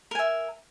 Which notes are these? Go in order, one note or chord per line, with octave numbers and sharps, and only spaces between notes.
A#4 E5 G#5